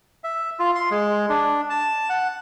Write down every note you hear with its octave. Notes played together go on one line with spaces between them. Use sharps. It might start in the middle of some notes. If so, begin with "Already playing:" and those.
E5
F4
C6
G#3
D4
A5
F#5